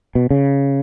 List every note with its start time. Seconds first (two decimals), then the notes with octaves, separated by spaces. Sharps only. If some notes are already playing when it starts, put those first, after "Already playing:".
0.15 B2
0.31 C#3